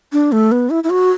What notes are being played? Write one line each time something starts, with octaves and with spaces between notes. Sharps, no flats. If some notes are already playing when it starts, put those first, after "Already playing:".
D4
A3
B3
E4
E4
F#4